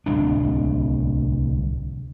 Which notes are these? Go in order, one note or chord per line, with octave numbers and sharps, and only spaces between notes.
D1 C2 D4